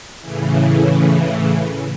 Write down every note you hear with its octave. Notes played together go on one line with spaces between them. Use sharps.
A2 C#3 E3